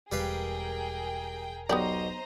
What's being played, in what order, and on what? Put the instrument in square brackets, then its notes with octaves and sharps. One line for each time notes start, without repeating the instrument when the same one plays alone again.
[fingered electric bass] E1 [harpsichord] G3 B4 F5 [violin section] G#4 A#4 G5
[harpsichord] B1 [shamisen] B3 G4 D5 [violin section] C5 D#5 A#5